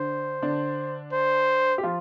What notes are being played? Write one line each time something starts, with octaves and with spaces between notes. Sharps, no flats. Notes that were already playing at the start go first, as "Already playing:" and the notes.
Already playing: D3 D4 C5
D3 D4
C5
G4
F3 F4